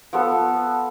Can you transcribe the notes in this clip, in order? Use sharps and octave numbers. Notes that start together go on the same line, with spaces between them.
F3 B3 A4